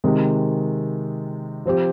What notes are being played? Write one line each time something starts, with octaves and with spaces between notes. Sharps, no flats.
C3 D#3 G#3
F3 C4 G4